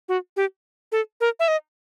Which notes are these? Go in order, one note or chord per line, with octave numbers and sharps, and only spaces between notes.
F#4
G4
A4
A#4
E5
D#5